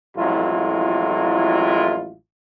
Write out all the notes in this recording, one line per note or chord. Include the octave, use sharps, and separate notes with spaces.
A1 F2 F#3 G#3 E4 F4